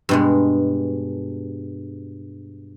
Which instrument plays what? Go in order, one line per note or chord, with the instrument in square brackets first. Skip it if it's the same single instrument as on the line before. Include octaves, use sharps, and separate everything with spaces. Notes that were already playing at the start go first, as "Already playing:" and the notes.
[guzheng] G2 B2 G#3